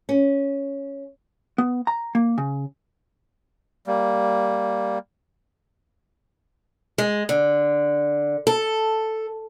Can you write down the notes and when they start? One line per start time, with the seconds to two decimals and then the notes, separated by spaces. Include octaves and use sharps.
0.09 C#4
1.58 B3
1.87 A#5
2.15 A#3
2.38 C#3
3.87 G3 A#3
6.98 G#3
7.29 D3
8.47 A4